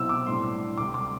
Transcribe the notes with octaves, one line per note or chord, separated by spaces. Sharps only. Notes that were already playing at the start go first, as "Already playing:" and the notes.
Already playing: C2 B2 F#3 C4 E4 E6
D6
A2 G3 D4 C6
D2 C3 G3 D6
D6